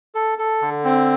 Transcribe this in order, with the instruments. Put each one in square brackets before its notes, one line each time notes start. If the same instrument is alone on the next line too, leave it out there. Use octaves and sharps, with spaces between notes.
[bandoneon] A4
A4
D3
C4